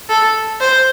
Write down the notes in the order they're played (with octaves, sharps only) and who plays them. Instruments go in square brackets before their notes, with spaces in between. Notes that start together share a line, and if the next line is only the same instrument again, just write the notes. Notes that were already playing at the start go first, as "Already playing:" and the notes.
[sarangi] A4
C5